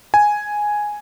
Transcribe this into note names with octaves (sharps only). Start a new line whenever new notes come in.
G#5